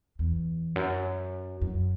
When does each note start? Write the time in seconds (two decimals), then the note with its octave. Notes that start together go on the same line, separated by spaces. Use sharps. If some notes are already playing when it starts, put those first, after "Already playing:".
0.19 E2
0.76 F#2
1.62 F#2